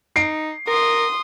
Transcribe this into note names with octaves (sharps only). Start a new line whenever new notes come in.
D#4 C7 D7
A#4 C6 D#6